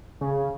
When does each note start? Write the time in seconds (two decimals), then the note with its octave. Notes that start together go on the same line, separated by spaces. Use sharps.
0.21 C#3